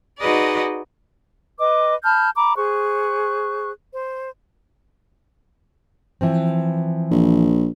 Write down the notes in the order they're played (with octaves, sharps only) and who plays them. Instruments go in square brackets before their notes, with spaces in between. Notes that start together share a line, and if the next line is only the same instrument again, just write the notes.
[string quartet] D#4 F#4 G#4 B4 D5 D#5
[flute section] B4 D#5 D6
A5 B5 F6 G6
A#5 B5 D6
G#4 C5 C#6 F#6
C5
[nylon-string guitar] E3 F3 C4
[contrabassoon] A#1